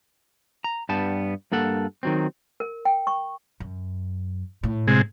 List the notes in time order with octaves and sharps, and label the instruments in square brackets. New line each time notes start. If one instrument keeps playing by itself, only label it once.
[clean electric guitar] A#5
G2 G3 B3 A5
G2 A#3 A4 F#5
D#3 F#3 C4
[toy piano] A#4
G5
C#6
[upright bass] F#2
A2
[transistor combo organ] C3 G#3